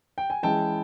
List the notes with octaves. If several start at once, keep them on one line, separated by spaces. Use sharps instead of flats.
G5
G#5
E3 G#3 C#4 E4 G5 A5